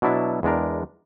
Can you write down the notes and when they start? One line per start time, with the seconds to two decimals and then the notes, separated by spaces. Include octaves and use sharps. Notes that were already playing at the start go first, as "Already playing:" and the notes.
0.02 B2 F#3 D4 E4 E5 A5
0.43 E2 G#3 D4 A#4